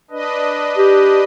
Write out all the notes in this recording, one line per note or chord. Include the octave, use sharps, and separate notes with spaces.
D4 B4 D#5
G4